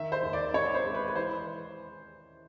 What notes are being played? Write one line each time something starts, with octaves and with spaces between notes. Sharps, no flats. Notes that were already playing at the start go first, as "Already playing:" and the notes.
Already playing: D#3 E5
C5
D#2
D5
C4 C#5
C5
G#3
B4
B4
E3 C5